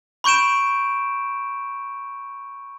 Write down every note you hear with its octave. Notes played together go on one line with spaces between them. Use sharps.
B5 C#6 G6 D7 E7